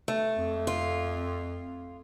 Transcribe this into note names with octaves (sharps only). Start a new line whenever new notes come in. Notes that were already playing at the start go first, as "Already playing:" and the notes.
A3
F2
F4